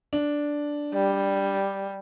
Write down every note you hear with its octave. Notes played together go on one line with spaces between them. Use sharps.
D4
G3